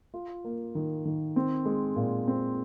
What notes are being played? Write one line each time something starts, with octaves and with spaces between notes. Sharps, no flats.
F4
A#3
D#3
D#3
C4
G#3
A#2
C4